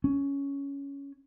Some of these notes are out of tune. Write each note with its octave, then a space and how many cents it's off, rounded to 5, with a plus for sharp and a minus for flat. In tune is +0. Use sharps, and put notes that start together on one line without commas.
C#4 +10